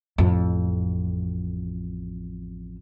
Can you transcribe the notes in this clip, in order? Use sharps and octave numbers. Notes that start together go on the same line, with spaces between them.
A1 F2